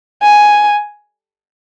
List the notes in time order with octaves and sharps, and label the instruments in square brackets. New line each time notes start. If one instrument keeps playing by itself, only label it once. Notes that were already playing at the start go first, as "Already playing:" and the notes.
[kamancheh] G#5